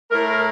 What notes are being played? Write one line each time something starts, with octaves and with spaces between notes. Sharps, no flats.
A2 A3 A#4